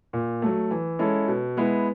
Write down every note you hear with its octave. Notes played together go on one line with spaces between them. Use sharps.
A#2
F#3 A3
E3
G#3 C#4 E4 A4
B2
G#3 B3 E4